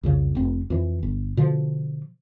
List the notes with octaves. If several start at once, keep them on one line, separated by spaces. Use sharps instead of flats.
C2 F2 C#3
F1 C4
F2 E3
G1
B2 D3 F3